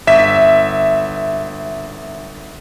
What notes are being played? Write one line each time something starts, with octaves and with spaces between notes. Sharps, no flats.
G1 E5 B6 E7